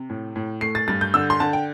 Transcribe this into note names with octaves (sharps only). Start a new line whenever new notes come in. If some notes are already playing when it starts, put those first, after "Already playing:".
Already playing: C3
A2
A2
A3 C7
A6
G2 A6
G6
D3 E6
C6
D3 A5
G5